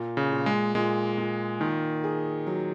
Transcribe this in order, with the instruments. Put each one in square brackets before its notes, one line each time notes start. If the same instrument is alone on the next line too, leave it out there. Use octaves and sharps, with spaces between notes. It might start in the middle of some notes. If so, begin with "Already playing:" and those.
Already playing: [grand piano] A#2
[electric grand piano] C#3
[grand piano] A#2
[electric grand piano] G#3
[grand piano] A#2 [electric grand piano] G#3
[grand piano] A#2
[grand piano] A#2 [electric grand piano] D#3
[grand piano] G#4
F#3